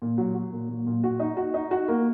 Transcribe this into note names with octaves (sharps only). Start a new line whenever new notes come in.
A#2
F#3
F#3
A#2
A#2
A#2
F#4
D#4
F#4
D#4
F#4
A#3